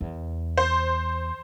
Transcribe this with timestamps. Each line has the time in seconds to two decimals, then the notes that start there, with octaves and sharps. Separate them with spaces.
0.01 E2
0.57 C5